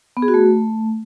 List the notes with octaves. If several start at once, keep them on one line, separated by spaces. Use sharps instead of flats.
B3
G#4
F#4
A3